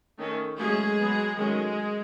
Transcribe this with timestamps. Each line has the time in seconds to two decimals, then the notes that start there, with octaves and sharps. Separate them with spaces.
0.19 D#3 A3 C#4
0.58 F#3 G#3 A3 C#4 G#4
0.98 F#3 B3
1.37 D#3 F#3 G#3 A3 C#4 G#4